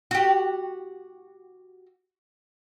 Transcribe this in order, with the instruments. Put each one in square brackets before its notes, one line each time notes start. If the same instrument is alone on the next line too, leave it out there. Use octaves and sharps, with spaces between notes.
[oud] F#4 G4